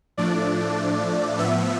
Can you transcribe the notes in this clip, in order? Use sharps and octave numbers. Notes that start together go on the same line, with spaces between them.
A2 F3 A3 D4 D5
A2 F3 B3 E5